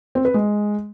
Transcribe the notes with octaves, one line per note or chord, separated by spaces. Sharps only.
C4
B4
G#3